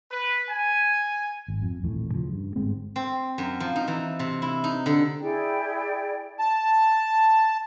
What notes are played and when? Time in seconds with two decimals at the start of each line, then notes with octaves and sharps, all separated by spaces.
0.12 B4
0.50 G#5
1.48 G#1
1.62 F2
1.83 D#1 A1 F2 A2
2.12 C#3 F3
2.33 G2
2.56 G1 G#2 G#3 C4
2.96 C4
3.38 F#2
3.60 F3
3.76 D#4
3.88 E3
4.19 C3
4.42 E4
4.64 D#4
4.86 D3
5.21 E4 G#4 D5 G5
6.39 A5